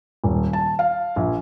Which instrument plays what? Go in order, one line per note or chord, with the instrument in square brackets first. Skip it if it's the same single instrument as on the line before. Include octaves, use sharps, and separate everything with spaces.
[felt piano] D#1
A5
F5
A#1